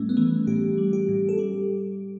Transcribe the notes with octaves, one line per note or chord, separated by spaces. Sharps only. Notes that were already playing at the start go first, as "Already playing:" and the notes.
Already playing: A2 G3 A3 C#4
B3
E3 A3
A2 G4
G3
G4
A2
A4
G3 G4